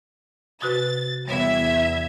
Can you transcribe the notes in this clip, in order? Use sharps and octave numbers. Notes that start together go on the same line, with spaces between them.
C3 F#4 B4 A6
E2 G3 B3 E5 G#6